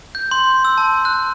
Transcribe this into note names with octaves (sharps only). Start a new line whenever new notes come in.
G6
C6
E6
A5
F#6